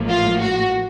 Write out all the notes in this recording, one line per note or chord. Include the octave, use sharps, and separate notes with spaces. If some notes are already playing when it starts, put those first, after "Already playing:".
Already playing: A1 A2 F3 A#3
F4
F#4